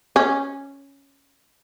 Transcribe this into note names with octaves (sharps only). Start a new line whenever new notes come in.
C#4